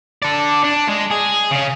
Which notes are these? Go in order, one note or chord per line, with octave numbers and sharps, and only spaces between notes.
A4 D5
D4
G#3
G#4
C#3 C#4